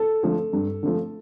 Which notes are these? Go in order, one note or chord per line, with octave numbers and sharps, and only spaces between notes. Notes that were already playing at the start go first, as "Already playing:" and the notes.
Already playing: A4
D3 F3 A3
G2
D3 F3 A3